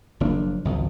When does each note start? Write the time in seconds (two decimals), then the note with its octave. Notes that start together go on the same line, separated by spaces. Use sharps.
0.20 F#1 F3 A#3 D4
0.65 G#1 C#2 F#2